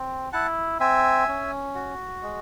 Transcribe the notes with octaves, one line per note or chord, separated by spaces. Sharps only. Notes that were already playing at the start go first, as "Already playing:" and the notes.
Already playing: C4
E4 F#5 A5
C4 E5 G#5
C#4
F#4
G#3